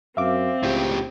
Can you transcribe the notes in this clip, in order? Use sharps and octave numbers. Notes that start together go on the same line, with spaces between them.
F#2 C4 E5 F5 D6
C#2 A2 G4